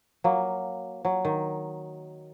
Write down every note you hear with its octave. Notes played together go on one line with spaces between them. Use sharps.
F#3 A#3
F#3
D#3